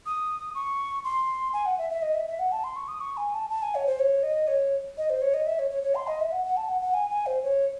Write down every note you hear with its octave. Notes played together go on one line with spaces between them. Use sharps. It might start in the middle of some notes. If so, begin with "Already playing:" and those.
D#6
C#6
C6
G#5
F#5
E5
E5
D#5
E5
E5
F#5
A5
C6
C#6
D#6
C#6
G#5
A5
A5
G#5
C#5
C5
C#5
D#5
C#5
D#5
C5
C#5
D#5
E5
C#5
C#5
C#5
C6
D#5
E5
F#5
F#5
A5
F#5
F#5
G#5
G#5
C5
C#5